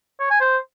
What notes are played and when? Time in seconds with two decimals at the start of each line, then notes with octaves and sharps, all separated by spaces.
0.20 C#5
0.30 G#5
0.40 C5